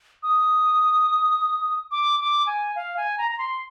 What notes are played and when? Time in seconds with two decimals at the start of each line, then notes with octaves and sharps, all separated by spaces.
0.23 D#6
1.91 D6
2.20 D6
2.47 G#5
2.76 F5
2.97 G#5
3.18 A#5
3.31 A#5
3.38 C6